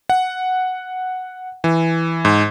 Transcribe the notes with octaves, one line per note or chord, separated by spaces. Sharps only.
F#5
E3
G#2